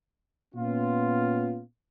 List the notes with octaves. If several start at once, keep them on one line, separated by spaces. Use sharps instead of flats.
A#2 B3 C#4 F4